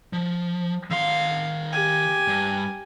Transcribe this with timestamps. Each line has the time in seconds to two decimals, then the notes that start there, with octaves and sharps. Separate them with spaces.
0.13 F3
0.90 D#3 F5 C6
1.73 G4 G#5
2.28 G2